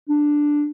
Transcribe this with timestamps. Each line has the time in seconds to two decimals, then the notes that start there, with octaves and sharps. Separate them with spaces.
0.09 D4